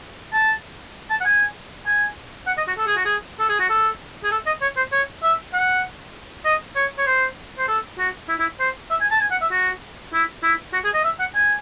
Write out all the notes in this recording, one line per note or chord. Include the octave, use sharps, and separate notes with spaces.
A5
A5
F#5
G#5
G#5
F#5
D#5
F#4
A4
G#4
F#4
G#4
A4
G#4
F#4
A4
G#4
A4
D#5
C#5
C5
C#5
E5
F#5
D#5
C#5
C#5
C5
C5
A4
F#4
E4
E4
C5
E5
G#5
A5
G#5
F#5
E5
F#4
E4
E4
F#4
G#4
D#5
E5
F#5
G#5